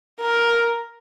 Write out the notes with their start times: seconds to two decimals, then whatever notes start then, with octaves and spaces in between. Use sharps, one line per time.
0.20 A#4